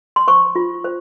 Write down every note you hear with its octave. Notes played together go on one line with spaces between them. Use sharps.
C6
C5 C#6
F4
C5